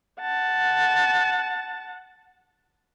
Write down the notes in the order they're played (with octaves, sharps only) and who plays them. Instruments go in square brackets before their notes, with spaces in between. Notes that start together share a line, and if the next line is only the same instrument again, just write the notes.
[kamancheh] F#5 A5